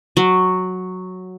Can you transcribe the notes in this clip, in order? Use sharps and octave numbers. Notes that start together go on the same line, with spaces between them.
F#3